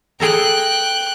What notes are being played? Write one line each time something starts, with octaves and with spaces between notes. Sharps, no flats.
G#4 A4 G5 A#5 F#6